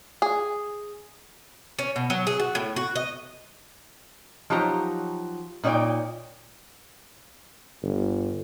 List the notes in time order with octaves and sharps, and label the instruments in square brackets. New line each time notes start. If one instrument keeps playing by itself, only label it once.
[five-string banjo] G#4
[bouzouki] C#4
B2
F#3
G#4
F#4
A2
F#4
D#5
[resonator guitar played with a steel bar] F3 F#3 D#4 G4 C#5 A#5
A#2 D#4 C#5 D5 G5
[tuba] G1